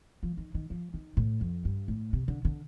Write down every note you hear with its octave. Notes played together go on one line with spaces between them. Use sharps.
F3
D#3
D#3
F3
D#3
A2
F2
G2
A2
C3
D3
D3